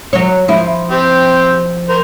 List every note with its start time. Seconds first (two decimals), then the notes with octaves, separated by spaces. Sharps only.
0.13 F#3 C#5
0.48 F3 E4
0.91 C4 G4
1.89 A#4 C5